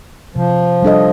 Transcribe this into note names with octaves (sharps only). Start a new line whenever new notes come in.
C3 F3
G3 D4 A4 D#5